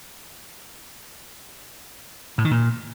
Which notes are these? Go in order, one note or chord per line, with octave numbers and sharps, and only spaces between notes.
A2
D#3
A#2